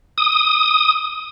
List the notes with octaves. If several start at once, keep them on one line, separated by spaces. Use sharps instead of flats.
D#6